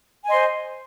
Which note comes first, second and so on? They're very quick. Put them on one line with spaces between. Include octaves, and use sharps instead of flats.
G#5 D#5 C6 C5